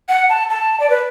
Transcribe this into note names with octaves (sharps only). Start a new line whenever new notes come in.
F#5
A5
A5
D5
B4